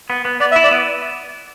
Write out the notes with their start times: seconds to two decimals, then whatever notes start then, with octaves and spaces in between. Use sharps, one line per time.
0.10 B3
0.25 B3
0.40 B3 D5
0.52 E5
0.56 E4
0.64 D5
0.71 B3